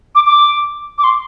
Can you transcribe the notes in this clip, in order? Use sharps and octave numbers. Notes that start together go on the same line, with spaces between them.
D6
D6
D6
C6